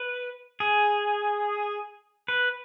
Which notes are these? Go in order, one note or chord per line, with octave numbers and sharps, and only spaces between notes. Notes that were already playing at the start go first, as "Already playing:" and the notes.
Already playing: B4
G#4
B4